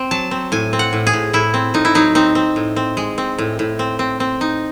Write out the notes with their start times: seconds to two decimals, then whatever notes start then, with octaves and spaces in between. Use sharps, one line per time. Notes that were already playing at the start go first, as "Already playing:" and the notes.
Already playing: C4
0.11 F#3 A5
0.31 C4
0.52 A2 G#5
0.73 C4
0.79 F#5
0.93 A2
1.07 G#4
1.13 A2
1.33 A2 E4
1.54 C4
1.74 A2 D#4
1.85 E4
1.95 F#3 D#4
2.15 C4 D#4
2.35 C4
2.56 A2
2.76 C4
2.97 G#3
3.18 C4
3.38 A2
3.59 A2
3.79 C4
3.99 C4
4.20 C4
4.41 D#4